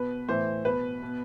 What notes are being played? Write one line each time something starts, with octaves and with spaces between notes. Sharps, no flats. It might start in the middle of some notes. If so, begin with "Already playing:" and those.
Already playing: B2 B4
A2 E3 C5
B2 B4
B2